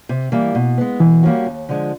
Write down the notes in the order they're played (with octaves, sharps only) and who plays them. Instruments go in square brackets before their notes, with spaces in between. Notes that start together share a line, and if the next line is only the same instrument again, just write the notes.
[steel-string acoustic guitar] C3
E3 G3 A#3
B2
G#3 B3
[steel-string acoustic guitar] B2 [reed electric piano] E3
[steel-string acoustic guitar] G3 A#3 C#4 F#4
D#2
D3 F3 G#3